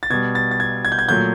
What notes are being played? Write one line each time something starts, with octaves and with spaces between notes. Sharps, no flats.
A6
B2 G3 G#6
A6
A6
G#6
G#6
G6
G#6
A#2 F#3 A3 G6